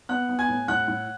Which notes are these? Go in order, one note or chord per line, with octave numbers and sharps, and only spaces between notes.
B3 F#5 F#6
B3
G#5 G#6
A2
A2 F#5 F#6
A2